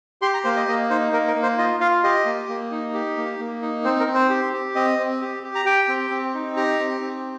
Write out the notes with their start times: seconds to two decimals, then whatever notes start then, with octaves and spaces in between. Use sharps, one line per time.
0.22 G4 C6
0.34 A#5
0.44 A#3 C5
0.57 D#5
0.68 A#3 D#5
0.90 D#4 C5
1.12 A#3 A#4
1.28 A#4
1.35 A#3
1.43 C5
1.58 F4 D#5
1.80 F4 F5
2.04 G4 D#5
2.25 A#3
2.49 A#3
2.71 D#4
2.94 G4
3.17 A#3
3.39 A#3
3.62 D#4
3.84 C4 C5
4.00 A#4
4.07 C4
4.15 C5
4.29 G4
4.53 G4
4.75 C4 D#5
4.99 C4
5.21 G4
5.43 G4
5.55 A#5
5.66 G4 G5
5.88 C4
6.11 C4
6.34 D#4
6.56 G4 A#5
6.79 C4
7.01 C4